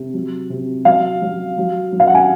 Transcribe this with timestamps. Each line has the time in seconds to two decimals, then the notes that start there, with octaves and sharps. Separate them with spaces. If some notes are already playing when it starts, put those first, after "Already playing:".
Already playing: C3
0.14 F#3
0.50 C3
0.85 F#3 F5
1.22 F#3
1.58 F#3
1.92 F#3
2.00 F5
2.07 F#5
2.14 G#5